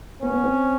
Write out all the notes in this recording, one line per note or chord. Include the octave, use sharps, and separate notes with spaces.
B3 C#4
B3
C4